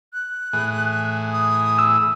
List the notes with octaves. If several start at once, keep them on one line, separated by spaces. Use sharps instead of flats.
F#6
A2 E3 G#4
D#6
E6